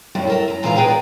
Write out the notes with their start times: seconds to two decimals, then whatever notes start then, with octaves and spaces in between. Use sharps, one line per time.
0.15 F#2 A2 G3 A#3 C#4 D4
0.27 A4 A#4 E5
0.48 F#2 A#5
0.63 A#2 E3 G#3 F4 F5 A#5
0.76 B2 G#4 B4 D#5 G5 A#5
0.88 A#4 D5